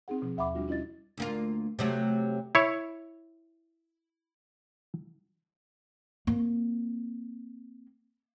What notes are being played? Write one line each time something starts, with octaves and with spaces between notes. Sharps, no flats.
C4 D#4 G#4 F#5
B2 F3
D#2 E5 F#5 B5 D6
G3 D4 F4 F#4
C#4 E4 F4 D#5 A6
D2 A#3 F4
C3 F#3 A3
E4 C#5
A#3 C4